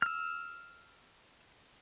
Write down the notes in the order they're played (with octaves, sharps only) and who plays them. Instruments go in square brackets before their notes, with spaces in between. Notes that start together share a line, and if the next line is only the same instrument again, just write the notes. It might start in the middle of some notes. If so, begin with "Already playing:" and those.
[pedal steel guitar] E6 F6